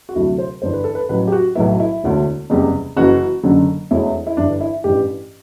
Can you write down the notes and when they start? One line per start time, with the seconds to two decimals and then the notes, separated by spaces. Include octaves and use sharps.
0.09 F#4
0.15 D2 C3 F#3 A3 E4
0.38 C5
0.62 G1 G2 E3 C5
0.73 B4
0.84 A4
0.95 B4
1.09 A1 A2 F#3 B4
1.28 G4
1.32 F#4
1.55 B1 A2 F#3 B3 E4
1.80 E4
2.03 E1 D2 D3 A3
2.50 F#1 E2 C3 G3
2.97 F#1 F#2 E3 F#4
3.43 F#1 F#2 D3 F#3
3.90 E1 E2 B2 A3 E4
4.27 E4
4.37 G1 G2 E3 D4
4.61 E4
4.84 A1 G2 E3 G4